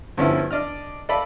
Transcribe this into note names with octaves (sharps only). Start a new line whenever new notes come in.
G2 D3 F3 B3 C#4 E4
D4 D5 D#5 F6
A4 D5 D#5 F5 B5